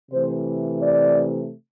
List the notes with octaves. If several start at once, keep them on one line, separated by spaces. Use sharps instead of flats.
C3 E3 A3 C5
D5